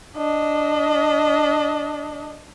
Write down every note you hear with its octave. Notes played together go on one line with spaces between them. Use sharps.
D4 D#5